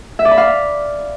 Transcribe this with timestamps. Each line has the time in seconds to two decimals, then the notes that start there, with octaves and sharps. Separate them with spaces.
0.19 E5
0.25 D5
0.31 B5
0.37 F5